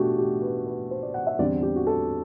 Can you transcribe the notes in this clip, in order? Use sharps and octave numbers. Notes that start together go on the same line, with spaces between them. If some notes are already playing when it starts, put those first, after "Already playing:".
Already playing: B2 A3 D4 F#4 G4
G4
B4
B4
C5
D5
F#5
E5
E2 D3 G3 C4 D5
G4
F#4
A4